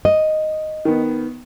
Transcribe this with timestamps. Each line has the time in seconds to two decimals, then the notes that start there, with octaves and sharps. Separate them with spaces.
0.05 D#5
0.85 D#3 B3